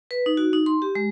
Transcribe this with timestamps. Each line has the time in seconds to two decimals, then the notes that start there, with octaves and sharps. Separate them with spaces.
0.11 B4
0.26 D#4
0.37 F#4
0.53 D#4
0.66 C6
0.82 G4
0.95 G#3